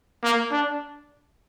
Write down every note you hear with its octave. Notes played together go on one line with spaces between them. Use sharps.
A#3
D4